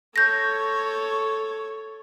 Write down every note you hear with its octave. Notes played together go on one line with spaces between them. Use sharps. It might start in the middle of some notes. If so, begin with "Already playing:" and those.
A4 C#5 G6 A#6